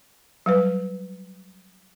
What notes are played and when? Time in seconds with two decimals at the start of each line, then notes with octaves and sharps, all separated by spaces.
0.46 F#3 G3 B4